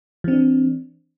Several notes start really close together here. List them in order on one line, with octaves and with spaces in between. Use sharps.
E3 C4 D4